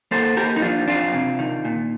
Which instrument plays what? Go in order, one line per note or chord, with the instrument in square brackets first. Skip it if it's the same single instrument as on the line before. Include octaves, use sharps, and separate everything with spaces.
[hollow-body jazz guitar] A#3 A4 C5
A#3 G4 A#4
D#4
F3 D4 F4
F2 D4 F4
C3
D#3
A#2